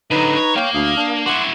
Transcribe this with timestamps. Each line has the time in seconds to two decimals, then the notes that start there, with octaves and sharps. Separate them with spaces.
0.11 D3 F#3 D#4 B4 A#5
0.36 C#5
0.56 A#3 C#5 F5 G5
0.75 D2 F5 D#6
0.97 D4
1.26 E4 F#4 F#5 C6 D6